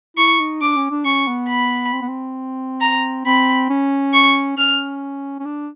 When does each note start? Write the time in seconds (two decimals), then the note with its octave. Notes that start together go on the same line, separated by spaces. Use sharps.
0.17 E4 C#6
0.40 D#4
0.61 D4 D6
0.76 C#4
0.90 D4
1.05 C#4 C#6
1.27 B3
1.49 B5
1.93 C4
2.01 B3
2.08 C4
2.81 A#5
3.25 C4 B5
3.69 C#4
4.13 C#6
4.57 C#4 F6
5.39 C#4
5.45 D4